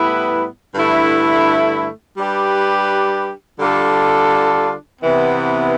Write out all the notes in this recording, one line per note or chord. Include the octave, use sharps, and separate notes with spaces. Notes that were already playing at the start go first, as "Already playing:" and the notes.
Already playing: A2 G3 B3 E4 B4
G2 D3 A3 E4
G3 D4 G4 B4
D3 G3 D4 F4 A4
C3 E3 B3